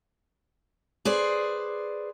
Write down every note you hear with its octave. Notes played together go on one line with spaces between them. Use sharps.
G#4 B4 C5 D5